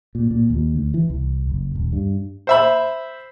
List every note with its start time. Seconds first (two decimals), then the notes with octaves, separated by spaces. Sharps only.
0.15 A#2
0.31 A#2
0.50 D#2
0.74 D2
0.94 E3
1.10 C2
1.50 F#1
1.75 D#1
1.93 G2
2.47 C5 E5 B5